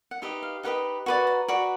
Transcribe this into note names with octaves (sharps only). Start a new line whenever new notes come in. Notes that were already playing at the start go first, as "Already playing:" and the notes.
F#5
D#4 G4 B4 D#5 E5
F5
D#4 G4 B4 D#5 F#5
F#4 B4 D5
A#5
F#4 B4 D5